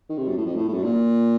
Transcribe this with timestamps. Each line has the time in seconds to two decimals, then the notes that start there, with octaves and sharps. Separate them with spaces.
0.09 D#3
0.18 C3
0.28 F#2
0.37 A2
0.46 F2
0.55 A2
0.68 A2
0.73 F#2
0.84 A#2